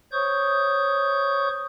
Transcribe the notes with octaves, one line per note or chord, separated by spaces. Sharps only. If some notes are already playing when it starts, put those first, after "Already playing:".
C5 C#5 C#6 D#6 G6